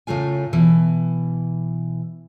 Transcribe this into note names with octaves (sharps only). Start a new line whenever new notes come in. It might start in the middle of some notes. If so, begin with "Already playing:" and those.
A2 C#3 A3 F4 G#5
B2 E3